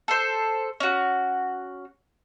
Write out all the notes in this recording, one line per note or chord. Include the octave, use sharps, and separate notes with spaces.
A4 C5
C#4 F#4